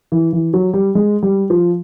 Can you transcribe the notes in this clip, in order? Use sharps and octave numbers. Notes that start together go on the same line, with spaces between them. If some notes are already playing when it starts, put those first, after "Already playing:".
E3
E3
F#3
G3
G#3
G3
F3